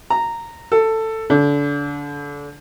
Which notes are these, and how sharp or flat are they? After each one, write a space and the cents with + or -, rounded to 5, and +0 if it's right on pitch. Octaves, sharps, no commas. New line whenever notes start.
A#5 -10
A4 +15
D3 -30